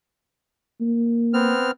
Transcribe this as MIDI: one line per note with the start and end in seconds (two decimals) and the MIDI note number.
0.81 1.54 58
1.34 1.71 59
1.34 1.71 60
1.34 1.71 89